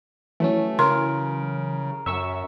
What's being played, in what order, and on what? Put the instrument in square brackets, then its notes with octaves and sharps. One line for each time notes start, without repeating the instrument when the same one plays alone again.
[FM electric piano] E3 F#3 C#4 [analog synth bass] A3
[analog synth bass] C#3 [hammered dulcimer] A#4 [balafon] C6
[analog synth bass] F#2 [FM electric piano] E5 C#6 E6